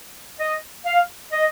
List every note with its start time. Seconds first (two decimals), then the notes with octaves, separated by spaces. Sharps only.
0.39 D#5
0.85 F5
1.32 D#5